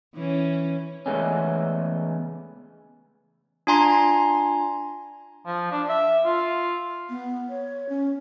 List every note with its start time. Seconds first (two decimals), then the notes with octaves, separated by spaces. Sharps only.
0.14 E3 C#4
1.06 E2 C#3 G#3 A3 B3 C#4
3.67 D4 F4 G#5 A#5 C6
5.46 F3
5.71 D4
5.89 E5
6.25 F4
7.09 B3
7.49 C#5
7.89 C#4